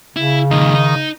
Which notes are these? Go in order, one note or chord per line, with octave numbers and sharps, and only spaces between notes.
C#3 E4
F2 A#2 D#3
D#4